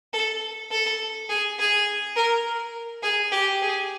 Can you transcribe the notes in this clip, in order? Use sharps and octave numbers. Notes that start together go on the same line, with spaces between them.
A4
A4
G#4
G#4
A#4
G#4
G4
G#4